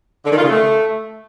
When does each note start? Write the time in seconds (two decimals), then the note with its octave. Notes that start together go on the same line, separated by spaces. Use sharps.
0.24 D3
0.30 D#3
0.37 F4
0.43 C#3
0.49 A3